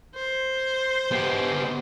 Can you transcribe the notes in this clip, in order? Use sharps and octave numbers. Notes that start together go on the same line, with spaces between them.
C5
B3 G4